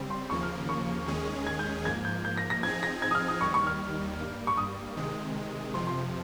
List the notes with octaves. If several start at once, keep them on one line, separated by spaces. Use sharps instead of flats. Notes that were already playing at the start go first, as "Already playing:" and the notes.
Already playing: C#3 G3 C4
C6
D#2 C#3 F3 A#3 C#6
F6
C#6
D#2 D#3 G#3 C#4 G#4
G#6
G6
G#2 F3 A#3 G#6
G6
G6
A#6
A#6
F3 C4 D#4 G#4 G#6
A#6
G#6
D#6
F6
D#6
D#2 D#3 G3 C#6
C#6
F6
G2 G3 A#3
C#6
D#6
C3 D#3 G#3
F2 C3 F3 C6
C6